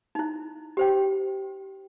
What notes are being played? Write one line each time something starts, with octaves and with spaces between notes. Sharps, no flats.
D#4 E4
G4 C5 G5